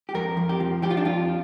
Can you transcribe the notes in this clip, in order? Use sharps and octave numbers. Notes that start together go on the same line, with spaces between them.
G4
F2 A#4
F2
G4
F3
F3 G4
F4
D4
F2 F4